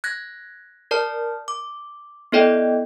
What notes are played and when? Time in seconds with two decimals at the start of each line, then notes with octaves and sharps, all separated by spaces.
0.04 F#6 G#6 A#6
0.91 A#4 D5 A5 F6
1.48 D6
2.32 B3 E4 A4 D5 D#5 G5